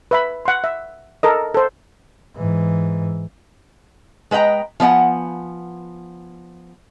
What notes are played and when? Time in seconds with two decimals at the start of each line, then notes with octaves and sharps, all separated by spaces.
0.11 B4 E5 B5
0.45 F#5 C6
0.64 E5
1.23 A4 A#4 D#5
1.54 A4 C5
2.37 G#2 E3
4.31 G#3 B4 D#5 G5 A#5
4.80 F3 B3 D5 F#5 G#5